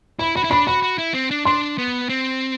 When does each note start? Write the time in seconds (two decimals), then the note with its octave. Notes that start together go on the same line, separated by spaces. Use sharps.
0.19 E4 B5
0.35 F#4 B5
0.44 E4
0.50 D4 B5
0.67 F#4 B5
0.83 F#4
0.98 E4
1.14 C4
1.31 D4
1.45 D4 C6
1.78 B3
2.09 C4